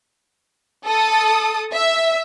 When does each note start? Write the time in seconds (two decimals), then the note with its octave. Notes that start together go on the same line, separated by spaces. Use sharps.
0.86 A4 D#6
1.73 E5